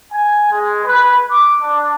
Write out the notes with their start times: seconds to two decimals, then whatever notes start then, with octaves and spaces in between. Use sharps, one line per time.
0.12 G#5
0.51 G#3
0.85 B4
1.29 D6
1.61 D4